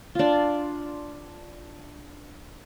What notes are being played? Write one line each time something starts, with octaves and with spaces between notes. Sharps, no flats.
D4 F4